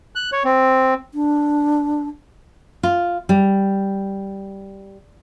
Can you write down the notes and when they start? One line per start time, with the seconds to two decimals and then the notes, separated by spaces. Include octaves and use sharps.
0.15 F#6
0.32 C#5
0.44 C4
1.12 D4
2.83 F4
3.29 G3